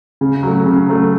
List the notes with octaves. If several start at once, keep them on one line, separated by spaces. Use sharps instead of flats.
C#3
F#3 A3
C#3
F#3 A3